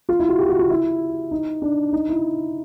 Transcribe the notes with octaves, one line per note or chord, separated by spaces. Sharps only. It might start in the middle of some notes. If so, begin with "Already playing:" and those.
F4
E4
F#4
G4
F#4
F4
E4
D#4
D4
D#4
E4